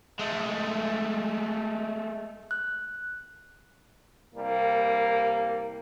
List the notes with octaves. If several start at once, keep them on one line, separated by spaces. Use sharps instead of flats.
G#3 A3
F#6
C2 G3 A#3